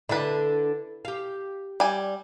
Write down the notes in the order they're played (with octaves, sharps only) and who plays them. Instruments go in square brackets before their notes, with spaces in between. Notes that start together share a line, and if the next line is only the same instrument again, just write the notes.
[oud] D3 D4 [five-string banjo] E4 B4
[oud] G4 F5
[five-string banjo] G3 G#5